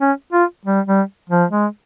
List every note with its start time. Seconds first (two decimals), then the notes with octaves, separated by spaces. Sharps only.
0.01 C#4
0.33 F4
0.65 G3
0.87 G3
1.30 F3
1.51 G#3